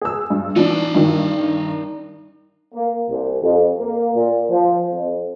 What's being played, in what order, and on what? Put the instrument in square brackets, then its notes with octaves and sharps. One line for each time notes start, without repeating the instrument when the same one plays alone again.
[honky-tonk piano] G#4 E6
G2
[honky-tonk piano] E3 D4 [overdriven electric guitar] D#4 D5
[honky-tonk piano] G2 D#3
[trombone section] A#3
C2
F2
A#3
A#2
F3
F2